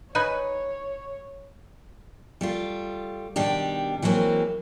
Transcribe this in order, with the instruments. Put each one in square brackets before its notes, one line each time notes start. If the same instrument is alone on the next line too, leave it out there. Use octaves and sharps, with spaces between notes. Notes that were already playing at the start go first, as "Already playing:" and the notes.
[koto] D#4 B4 G#5 [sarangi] C#5
[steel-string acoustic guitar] G3 A3 F4
B2 D#3 G3 D4 G4
E3 F#3 G#3 A#3 C4